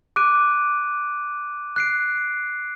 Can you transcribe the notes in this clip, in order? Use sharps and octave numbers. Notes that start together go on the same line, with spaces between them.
D6 F#6 D7 D#7
F#6 C7 D7